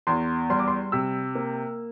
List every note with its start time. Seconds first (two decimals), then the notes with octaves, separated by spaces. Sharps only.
0.07 E2 C6
0.50 G3 C6
0.59 D6
0.68 C6
0.92 C3 E6
1.35 A#3